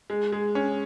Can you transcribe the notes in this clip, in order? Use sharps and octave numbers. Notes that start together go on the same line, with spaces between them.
G#3
G#3
C#4